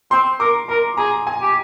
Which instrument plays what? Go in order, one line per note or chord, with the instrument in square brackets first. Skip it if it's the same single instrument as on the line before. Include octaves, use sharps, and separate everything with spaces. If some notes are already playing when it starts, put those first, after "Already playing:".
[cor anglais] C4 [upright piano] C6
[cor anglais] A#4 [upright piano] D6
[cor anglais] A#4 [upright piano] A#5
[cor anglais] G#4 [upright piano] A#5
[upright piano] G#5
[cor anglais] G4